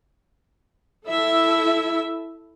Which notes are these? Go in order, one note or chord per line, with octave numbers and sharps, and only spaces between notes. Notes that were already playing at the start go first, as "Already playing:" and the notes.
E4 A4 E5